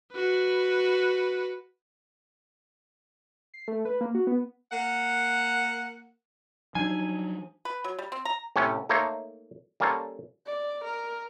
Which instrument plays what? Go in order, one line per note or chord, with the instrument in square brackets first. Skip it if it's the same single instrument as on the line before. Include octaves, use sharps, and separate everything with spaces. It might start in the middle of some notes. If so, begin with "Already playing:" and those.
[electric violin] F#4 B4
[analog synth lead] C7
A3
B4
A#3
F#4
B3
[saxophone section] A#3 F#5
[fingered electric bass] F3 F#3 [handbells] D4 D#4 [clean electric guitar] G#5
[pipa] B4
F#3
G3
C4
A#5
[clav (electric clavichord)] A2 C3 A3 C#4
A3 A#3 D#4 A#4 C5 C#5
G3 A#3 C#4 A4 A#4 C5
[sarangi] D5
A#4